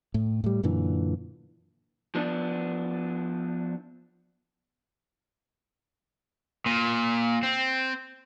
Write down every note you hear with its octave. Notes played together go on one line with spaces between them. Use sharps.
A2
A2 G3
F#2 A#2 D3 E3
F3 B3 D4
A#2
C4